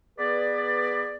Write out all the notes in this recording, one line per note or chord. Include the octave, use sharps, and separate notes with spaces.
B3 G#4 B4 D5